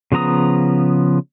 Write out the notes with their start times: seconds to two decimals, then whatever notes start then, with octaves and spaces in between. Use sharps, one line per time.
0.12 C#3 F3 B3 A#5 D#6